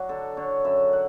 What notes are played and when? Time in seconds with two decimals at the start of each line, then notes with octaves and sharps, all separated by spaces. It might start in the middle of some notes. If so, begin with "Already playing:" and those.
Already playing: F#3 D4 F#4
0.09 D3 A4
0.37 D3 C#5
0.65 F#2 E5
0.93 F#5